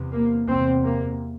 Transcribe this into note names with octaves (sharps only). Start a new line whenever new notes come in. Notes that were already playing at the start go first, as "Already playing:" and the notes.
Already playing: E2 C3
A#3
E2 C3 C4
A#3